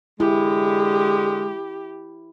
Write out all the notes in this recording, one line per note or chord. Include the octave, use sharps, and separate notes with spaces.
D3 G#3 E4 G4